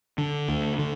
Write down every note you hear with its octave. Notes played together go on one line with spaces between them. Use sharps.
D3
D2
D3